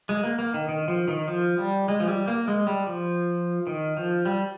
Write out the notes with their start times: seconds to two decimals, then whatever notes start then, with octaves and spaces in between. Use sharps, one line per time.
0.09 G#3
0.23 A#3
0.39 A#3
0.54 D#3
0.69 D#3
0.88 F3
1.08 D#3
1.28 F3
1.58 G3
1.88 G#3
2.00 F3
2.08 G3
2.28 A#3
2.48 G#3
2.67 G3
2.87 F3
3.67 D#3
3.97 F3
4.25 G3